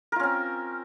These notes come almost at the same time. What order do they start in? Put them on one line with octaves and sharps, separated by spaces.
A#4 F4 C#4 C4